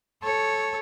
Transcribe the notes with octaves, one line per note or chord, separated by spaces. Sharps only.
A4 C#5